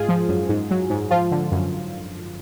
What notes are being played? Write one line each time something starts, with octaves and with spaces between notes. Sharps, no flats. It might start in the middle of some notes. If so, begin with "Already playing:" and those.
Already playing: G#2 G#3 F4 G#4
F3
F#2
G#2
F#3
G#2
F3 F4
D3
F#2